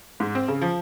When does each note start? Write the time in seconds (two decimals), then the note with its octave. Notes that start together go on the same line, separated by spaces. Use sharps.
0.20 G#2
0.35 C4
0.48 C#3
0.62 F3